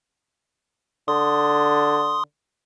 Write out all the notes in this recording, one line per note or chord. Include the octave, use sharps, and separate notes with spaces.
D3 C6 D#6